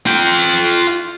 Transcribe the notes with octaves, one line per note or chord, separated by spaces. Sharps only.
F4 G5